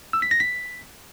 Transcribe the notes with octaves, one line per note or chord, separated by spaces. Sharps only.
E6
B6
A#6
B6